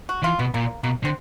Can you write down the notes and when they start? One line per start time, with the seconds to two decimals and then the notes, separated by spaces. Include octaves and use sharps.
0.09 F#4
0.23 E3 F4
0.39 B2 B3
0.54 A#2 A#3
0.83 B2 A#3
1.04 D3 C4